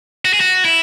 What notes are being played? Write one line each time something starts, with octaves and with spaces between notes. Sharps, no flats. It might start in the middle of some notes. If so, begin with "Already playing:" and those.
F#4
G#4
F#4
E4